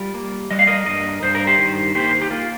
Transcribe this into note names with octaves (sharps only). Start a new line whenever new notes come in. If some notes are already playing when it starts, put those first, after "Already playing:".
Already playing: G3 F4 A#4
A#3
G3 D#5
F5
A#4 D#5
G2 A#4 D#5
G2 C5
A#4
G4 C5
D#3
A#3 G4 C5
G4
A#3 F4